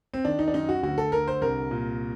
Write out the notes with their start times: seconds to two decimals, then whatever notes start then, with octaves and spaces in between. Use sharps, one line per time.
0.14 C4
0.25 D#3 D4
0.39 D#4
0.48 D4
0.54 F#2 D#4
0.69 F#4
0.83 D2 F#4
0.98 A4
1.12 D3 A#4
1.28 C5
1.41 C2 A#4
1.71 A#2